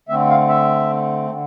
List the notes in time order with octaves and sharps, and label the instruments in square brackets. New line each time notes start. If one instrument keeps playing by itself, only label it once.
[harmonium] D3 A3 C4 E5
F5
E5
D3